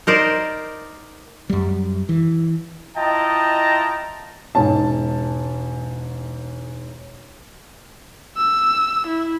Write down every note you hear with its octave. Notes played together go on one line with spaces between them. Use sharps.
D#4 A#4 C5 D5
F#2 G3
E3
E4 F4 D#5 G5 A5 A#5
E1 G#2 C#4 A5
E6
E4